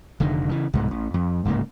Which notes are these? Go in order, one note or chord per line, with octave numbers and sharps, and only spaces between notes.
F1 D3 D#3
C#3 E3
C2 G#2 B2
A1
F2
D1 G#2 C#3 A#3